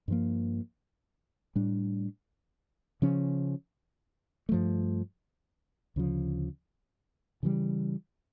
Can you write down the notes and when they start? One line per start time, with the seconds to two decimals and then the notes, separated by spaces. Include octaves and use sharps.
0.08 G2 F3 A#3
1.56 A2 G3 D4
3.02 C#3 F3 C#4
4.49 G2 F3 A3
5.96 D2 C#3 F3
7.43 C#3 E3 G3